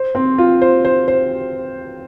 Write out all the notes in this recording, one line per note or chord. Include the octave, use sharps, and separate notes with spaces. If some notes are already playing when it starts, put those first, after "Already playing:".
Already playing: C5
C4
F4
C5
C5
C5